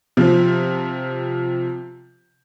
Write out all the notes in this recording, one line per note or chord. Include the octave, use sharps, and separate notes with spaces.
C3 F3